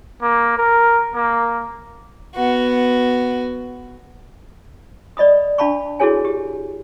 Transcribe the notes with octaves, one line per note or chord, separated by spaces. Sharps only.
A#3
A#4
A#3
B3 F#4
D5 D#5 B5 D#6
D4 F5 A5 B5 C#6
E4 F#4 G#4 A4 C#5 G#5
G4